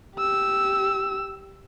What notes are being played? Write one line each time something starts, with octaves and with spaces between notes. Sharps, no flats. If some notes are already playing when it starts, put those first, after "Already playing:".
G4 E6